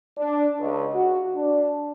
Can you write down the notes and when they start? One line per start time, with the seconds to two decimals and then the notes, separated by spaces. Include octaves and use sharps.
0.18 D4
0.59 C#2
0.93 F#4
1.36 D4